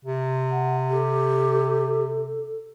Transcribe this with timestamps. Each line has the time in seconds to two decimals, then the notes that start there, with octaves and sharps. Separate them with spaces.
0.05 C3
0.51 F#5
0.90 G4 A4